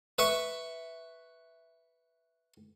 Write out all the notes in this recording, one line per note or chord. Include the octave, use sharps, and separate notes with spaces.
B4 E5 C#6